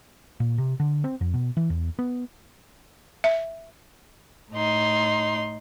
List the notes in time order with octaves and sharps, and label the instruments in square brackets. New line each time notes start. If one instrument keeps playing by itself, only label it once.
[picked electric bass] A#2
C3
D3
C4
F2
B2
E3
E2
B3
[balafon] E5
[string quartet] A2 D#4 C6